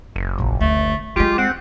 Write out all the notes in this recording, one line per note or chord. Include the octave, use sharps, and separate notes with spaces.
F#1
A#1 A#3
D2 A3
G3 G#3 F4 G4
C4 F#5